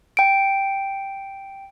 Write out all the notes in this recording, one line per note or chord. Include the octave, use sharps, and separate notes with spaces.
G5 D7